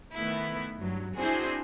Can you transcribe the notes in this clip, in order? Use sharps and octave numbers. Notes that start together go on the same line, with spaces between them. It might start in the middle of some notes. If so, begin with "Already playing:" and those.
D#3 A3 B3 E4
G2 F#3
C4 D4 E4 F#4 G#4 C5